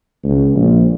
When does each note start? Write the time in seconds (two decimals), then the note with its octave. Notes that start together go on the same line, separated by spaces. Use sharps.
0.24 C#2
0.55 A#1